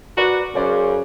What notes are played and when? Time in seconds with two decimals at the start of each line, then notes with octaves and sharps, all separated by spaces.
0.17 F#4 A#4 B4 D5
0.55 F#2 C#3 C#4 C5 D5